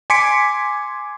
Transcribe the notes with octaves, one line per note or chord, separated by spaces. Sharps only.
G#5 C6 D6 B6 C#7 D7